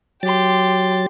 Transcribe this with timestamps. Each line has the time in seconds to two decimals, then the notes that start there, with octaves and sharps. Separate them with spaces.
0.23 F#3 G4 C6 A6